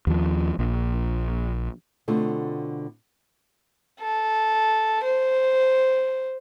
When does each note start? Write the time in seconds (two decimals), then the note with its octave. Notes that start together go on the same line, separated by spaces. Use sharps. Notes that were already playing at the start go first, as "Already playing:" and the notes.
0.07 D#2 F3
0.59 A#1
2.08 B2 D3 A3 C4 F4
4.00 A4
5.03 C5